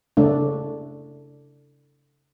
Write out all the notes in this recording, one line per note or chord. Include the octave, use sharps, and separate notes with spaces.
C#3 A3 D4